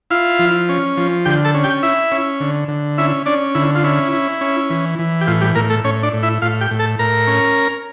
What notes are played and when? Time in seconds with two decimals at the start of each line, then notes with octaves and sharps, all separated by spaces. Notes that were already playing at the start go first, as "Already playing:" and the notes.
0.10 E4 F4 F5
0.39 F3
0.69 C#4
0.97 F3
1.25 D3 G4 G5
1.44 A4 A5
1.54 C#4
1.64 G4 G5
1.83 E4 E5
2.12 C#4
2.40 D3
2.68 D3
2.98 C#4 E4 E5
3.26 C#4 D4 D5
3.55 D3 E4
3.75 F4
3.84 C#4 E4
4.12 E4
4.41 C#4
4.70 E3
4.99 E3
5.21 G4
5.27 A2 F4
5.41 G3 G4
5.55 A2 A#3 A#4
5.70 A3 A4
5.84 A2 C#4 C#5
6.03 D4 D5
6.13 A2
6.23 E4 E5
6.42 A2 F4 F5
6.61 G4 G5
6.71 A2
6.79 A4 A5
6.99 A2 A#4 A#5
7.27 C#4